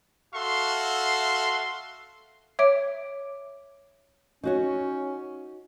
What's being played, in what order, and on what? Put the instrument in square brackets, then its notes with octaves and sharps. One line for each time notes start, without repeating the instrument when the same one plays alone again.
[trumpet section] F#4 A4 E5 F5 C6
[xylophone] C#5 E5 D6 D7
[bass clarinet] C#4 [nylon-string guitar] D#4 F#4 C#5